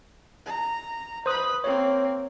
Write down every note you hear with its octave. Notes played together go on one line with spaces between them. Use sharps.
A#5
B4 C5 B5 D#6 F#6
A#3 C4 C#5